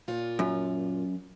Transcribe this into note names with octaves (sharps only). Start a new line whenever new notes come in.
A#2 F4 C#5
F#2